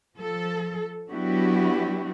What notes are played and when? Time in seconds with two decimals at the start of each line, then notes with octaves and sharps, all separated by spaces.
0.17 F3 A4
1.10 F#3 B3 D4 E4 F#4 G4